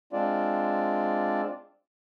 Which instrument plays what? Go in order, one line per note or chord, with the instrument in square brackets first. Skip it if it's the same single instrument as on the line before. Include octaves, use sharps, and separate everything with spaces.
[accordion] G#3 C4 D4 F4 D5